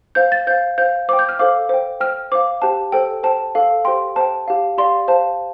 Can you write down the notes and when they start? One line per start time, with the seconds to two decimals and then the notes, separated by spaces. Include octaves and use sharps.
0.15 C5 F5 G6
0.32 A6
0.47 C5 F5 G6
0.78 C5 F5 G6
1.09 C5 D6
1.13 G5
1.19 G6
1.29 F6
1.39 A4 C5 F5 D6
1.69 C5 G5
2.00 C5 G5 F6
2.32 C5 F5 D6
2.62 G4 C5 G5 A5
2.92 A4 C5 G5
3.23 C5 G5 A5
3.55 A4 F5
3.85 G4 C5 G5 C6
4.16 C5 G5 A5
4.48 G4 F5
4.78 G4 D5 F5 C6
5.08 C5 F5 A5